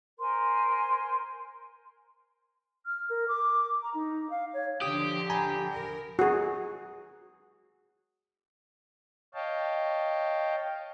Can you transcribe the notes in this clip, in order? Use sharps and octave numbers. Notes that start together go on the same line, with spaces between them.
A#4 C5 G#5 C6
F6
A#4
D6
A#5
D#4
F5
C#5
D3 F3 G4 D#6
G#5 A#5 B5
A#4
F#4 G#4
C#5 D#5 F5 G5 A5